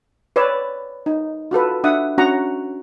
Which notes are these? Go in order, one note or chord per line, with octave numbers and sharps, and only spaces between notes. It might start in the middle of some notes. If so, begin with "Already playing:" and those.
B4 C#5 D5 E6
D#4
F4 F#4 A4 B4
D4 E5 F#5 D#6
C#4 D4 F#4 F#5 A#5 C#6